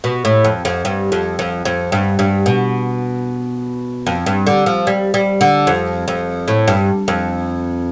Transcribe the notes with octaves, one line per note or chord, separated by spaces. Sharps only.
B2
A2
F2
F2
G2
F2
F2
F2
G2
G2
B2
F2
G2
D3
F3
G3
G3
D3
F2
F2
A2
G2
F2